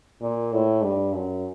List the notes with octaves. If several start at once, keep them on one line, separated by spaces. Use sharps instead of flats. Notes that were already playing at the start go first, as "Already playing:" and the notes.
A#2
A2
G2
F#2